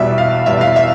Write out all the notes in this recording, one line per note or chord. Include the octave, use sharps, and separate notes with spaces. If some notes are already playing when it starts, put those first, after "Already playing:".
Already playing: E2 B2 G3 E5
F5
E2 B2 G3 E5
F5
E5